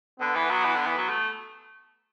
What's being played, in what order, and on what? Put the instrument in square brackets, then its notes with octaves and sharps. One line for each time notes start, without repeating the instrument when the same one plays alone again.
[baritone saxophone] D3 [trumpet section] B3
[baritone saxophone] E3
F#3
E3
D3
E3
F#3
A3